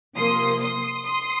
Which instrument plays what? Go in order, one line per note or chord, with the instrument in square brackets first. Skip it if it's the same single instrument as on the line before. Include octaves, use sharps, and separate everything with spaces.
[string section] C3 F3 A#3 C6 D#6
C6 D#6
C6 D#6